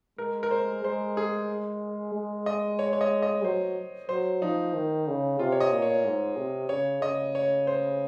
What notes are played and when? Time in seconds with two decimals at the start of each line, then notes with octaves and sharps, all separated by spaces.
0.18 G#3 A#4
0.43 A#4
0.51 C5
0.84 G#3 C5
1.17 G#4
2.14 G#3
2.46 D#5
2.79 C#5
2.93 C#5
3.01 D#5
3.22 D#5
3.44 F#3 C5
4.09 F#3 C5
4.42 F3 D#4
4.74 D#3
5.07 C#3
5.39 C3 F4
5.52 C#5
5.61 D#5
5.72 A#2
5.82 C#5
6.05 G#2
6.37 C3
6.69 C#3 C#5
7.02 C#3 D#5
7.35 C#5
7.67 C5